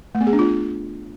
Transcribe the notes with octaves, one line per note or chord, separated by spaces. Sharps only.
A3
B3
G#4
D4
F4